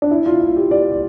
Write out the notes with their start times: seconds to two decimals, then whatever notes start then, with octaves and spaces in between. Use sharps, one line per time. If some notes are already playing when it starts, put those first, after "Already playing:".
0.02 D4
0.11 E4
0.26 F4
0.41 F4
0.56 G4
0.71 D5
0.91 D5